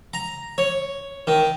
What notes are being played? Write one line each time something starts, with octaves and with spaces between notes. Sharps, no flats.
A#5
C#5
D#3